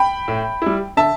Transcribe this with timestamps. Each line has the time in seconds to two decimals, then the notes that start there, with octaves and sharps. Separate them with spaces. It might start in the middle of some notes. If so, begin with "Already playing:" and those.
Already playing: G5 B5
0.28 A2
0.62 G3 E4
0.97 D3 E5 A5